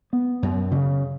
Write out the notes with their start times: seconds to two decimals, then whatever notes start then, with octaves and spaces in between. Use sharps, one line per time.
0.13 B3
0.43 F#2
0.71 C#3